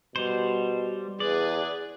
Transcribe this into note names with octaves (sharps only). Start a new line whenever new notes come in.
B2 G3 C5
E2 G#4 B4 D5